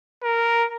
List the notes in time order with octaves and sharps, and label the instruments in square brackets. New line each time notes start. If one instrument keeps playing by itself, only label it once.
[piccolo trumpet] A#4